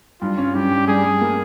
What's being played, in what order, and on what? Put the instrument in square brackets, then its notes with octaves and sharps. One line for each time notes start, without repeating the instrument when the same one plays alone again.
[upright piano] G2 [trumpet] F4
[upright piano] C#4
[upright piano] G2 [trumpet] G4
[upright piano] G2
[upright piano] G3 [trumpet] G#4
[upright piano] G3
A#3